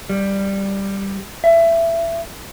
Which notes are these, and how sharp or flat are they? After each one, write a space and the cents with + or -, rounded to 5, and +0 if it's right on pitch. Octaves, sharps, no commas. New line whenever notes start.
G3 +5
E5 +20